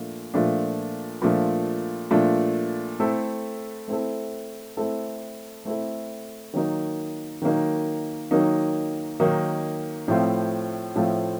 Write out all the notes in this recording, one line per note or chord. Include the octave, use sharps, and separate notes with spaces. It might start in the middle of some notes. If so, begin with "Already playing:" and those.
Already playing: A#2 F3 A3 D4
A#2 F3 A3 D4
A#2 F3 A3 D4
A#2 F3 A3 D4
A3 C4 E4 A4
A3 C4 E4 A4
A3 C4 E4 A4
A3 C4 E4 A4
D#3 F#3 A#3 D#4
D#3 F#3 A#3 D#4
D#3 F#3 A#3 D#4
D#3 F#3 A#3 D#4
A2 F3 A3 C4 F4
A2 F3 A3 C4 F4